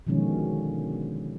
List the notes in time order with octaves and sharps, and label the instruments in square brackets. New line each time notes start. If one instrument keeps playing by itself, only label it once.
[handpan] B2 D3 D#3 F3 G#3 C#4